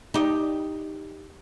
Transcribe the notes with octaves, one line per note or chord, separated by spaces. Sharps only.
D#4 G4